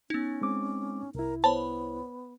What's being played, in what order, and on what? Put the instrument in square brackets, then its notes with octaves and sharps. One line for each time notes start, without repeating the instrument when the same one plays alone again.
[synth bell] B3 D#4 [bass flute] C#4
[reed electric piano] G#3 C4 D6
[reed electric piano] C2 E4 [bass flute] A#4
[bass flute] B3 [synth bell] C5 C#5 B5 [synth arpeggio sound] A5